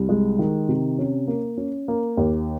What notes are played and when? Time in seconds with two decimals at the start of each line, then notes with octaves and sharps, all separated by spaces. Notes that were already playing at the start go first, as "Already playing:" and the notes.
Already playing: C2
0.09 G#3
0.39 D#3
0.69 C3
0.99 C#4
1.27 A#3
1.58 C#4
1.88 A#3
2.17 D#2